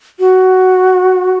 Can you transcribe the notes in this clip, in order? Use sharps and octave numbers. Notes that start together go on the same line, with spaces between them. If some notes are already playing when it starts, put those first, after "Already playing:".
F#4